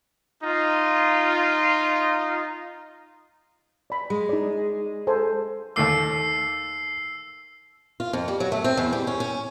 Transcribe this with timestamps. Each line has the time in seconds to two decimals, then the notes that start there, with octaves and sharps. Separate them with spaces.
0.42 D#4 F4
3.90 D5 B5
4.10 G#3
4.29 D#4 D5
5.07 A4 C5 G#5
5.76 D#2 A3 D6 E6 C7
8.00 F4
8.13 F2
8.28 G3
8.40 F#3
8.52 A3
8.64 C4
8.77 E2
8.93 G3
9.07 C#4
9.20 C#4